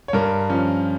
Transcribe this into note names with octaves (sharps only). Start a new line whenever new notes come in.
C#5
G2 A#4
F3 C#4